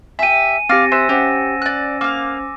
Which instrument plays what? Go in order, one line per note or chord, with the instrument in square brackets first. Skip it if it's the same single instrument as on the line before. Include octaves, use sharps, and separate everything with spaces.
[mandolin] G4 E5 [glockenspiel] G#5 D#7
[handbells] C4 G4 [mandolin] F5 D6 F6 [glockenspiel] A6 A#6 C#7
[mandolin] C5 [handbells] E5 F#6 B6 [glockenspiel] G#5 E6 E7
[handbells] C#4 C5 F#5 [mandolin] G4 [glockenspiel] A#6
[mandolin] D5 F#6
[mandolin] A#3 F5 [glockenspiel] D6